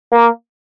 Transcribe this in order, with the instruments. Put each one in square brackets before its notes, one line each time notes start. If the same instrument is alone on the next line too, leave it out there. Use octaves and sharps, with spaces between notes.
[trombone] A#3